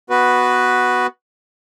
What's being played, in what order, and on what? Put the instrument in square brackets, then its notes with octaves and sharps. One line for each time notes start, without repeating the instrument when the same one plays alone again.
[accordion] B3 F#4 B4